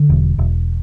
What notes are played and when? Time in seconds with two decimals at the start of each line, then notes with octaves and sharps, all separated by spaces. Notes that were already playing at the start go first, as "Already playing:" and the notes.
Already playing: D3
0.09 E1
0.38 E1